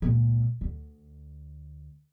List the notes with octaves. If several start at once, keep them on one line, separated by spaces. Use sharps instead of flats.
C#2 A#2
D2